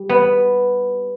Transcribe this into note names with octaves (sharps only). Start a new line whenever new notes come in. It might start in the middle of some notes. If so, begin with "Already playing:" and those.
Already playing: G3
B3